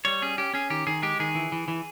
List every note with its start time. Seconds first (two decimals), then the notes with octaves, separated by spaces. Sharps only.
0.05 G3 C#5
0.22 C#4 G#4
0.38 C#4 G4
0.54 C#4 G#4
0.70 D#3 G4
0.87 D#3 G#4
1.03 G#3 G4
1.20 D#3 G#4
1.35 E3
1.52 E3
1.68 E3